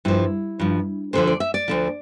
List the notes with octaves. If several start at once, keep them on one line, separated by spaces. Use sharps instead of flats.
G2 F3 E4
G2 F3
D2 D3 F3 C5
D5
E5
D5
D2 D3 F3